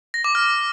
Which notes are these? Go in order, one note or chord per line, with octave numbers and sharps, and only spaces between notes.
A#6
D6
F6